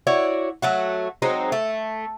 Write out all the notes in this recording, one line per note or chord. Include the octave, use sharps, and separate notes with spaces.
E4 F#4 C#5 D5
F#3 A3 F#4
F#3 G#3 C4 D#4
A3